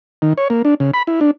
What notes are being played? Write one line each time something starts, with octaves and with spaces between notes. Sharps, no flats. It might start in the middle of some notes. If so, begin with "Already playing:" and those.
D#3
C#5
A#3
D4
C#3
B5
E4
D4